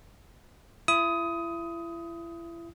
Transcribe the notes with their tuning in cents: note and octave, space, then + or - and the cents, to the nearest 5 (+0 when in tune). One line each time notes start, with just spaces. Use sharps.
E4 +35 D#6 +15